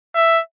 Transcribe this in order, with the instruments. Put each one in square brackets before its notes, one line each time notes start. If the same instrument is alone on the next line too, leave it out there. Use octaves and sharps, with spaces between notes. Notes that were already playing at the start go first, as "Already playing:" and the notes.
[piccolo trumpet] E5